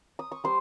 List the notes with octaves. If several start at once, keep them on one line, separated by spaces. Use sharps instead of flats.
D#6
C#6
G3 C5 C6